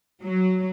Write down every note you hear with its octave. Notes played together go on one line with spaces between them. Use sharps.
F#3